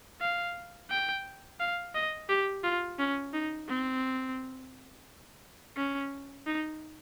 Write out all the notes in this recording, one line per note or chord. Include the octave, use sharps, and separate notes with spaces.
F5
G5
F5
D#5
G4
F4
C#4
D#4
C4
C#4
D#4